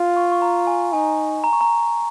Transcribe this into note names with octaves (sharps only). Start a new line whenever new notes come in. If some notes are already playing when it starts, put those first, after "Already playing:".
Already playing: F4
C#6
C#6
A#5
G#5
D#4 G#5
A#5
C#6
A#5